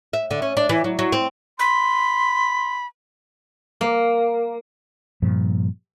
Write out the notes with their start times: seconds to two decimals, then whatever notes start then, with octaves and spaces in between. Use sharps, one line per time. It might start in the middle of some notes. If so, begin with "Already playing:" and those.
0.13 E5
0.31 D3
0.42 C#4
0.57 D4
0.69 E3
0.84 F#3
0.99 F#3
1.12 C4
1.59 B5 C6
3.81 A#3
5.22 G2 A#2 F3